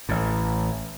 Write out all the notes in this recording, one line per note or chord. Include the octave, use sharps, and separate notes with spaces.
A1 A2